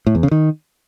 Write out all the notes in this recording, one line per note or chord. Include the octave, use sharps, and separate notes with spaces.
A2
E2
C#3
D#3